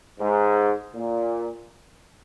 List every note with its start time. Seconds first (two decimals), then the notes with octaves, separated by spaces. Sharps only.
0.20 G#2
0.95 A#2